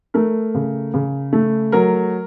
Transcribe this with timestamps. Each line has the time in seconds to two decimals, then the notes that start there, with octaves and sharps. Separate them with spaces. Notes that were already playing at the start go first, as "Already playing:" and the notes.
0.14 A3 A#4
0.55 C#3
0.94 C#3
1.33 A3
1.72 F#3 A#4